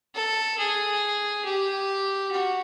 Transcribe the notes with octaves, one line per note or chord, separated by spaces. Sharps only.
A4
G#4
G4
F#4